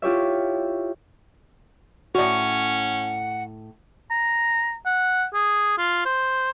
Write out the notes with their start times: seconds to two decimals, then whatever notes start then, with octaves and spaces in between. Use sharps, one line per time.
0.02 E4 F4 G4 C#5 E5
2.15 A2 C#4 F#4 C#5 D5 F#5
4.11 A#5
4.86 F#5
5.34 G#4
5.78 F4
6.05 C5